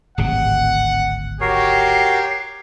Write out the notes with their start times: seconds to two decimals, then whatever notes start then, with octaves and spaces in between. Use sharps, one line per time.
0.18 D1 G#1 C3 F#5
1.41 F#4 G4 A#4 C#5 C7